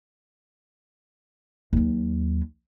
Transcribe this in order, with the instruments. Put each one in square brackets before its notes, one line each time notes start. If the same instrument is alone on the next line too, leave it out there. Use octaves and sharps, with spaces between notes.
[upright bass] D#2 F#3